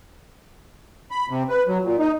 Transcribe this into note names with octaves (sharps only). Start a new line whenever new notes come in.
B5
C3
B4
F#3
A#2
D#4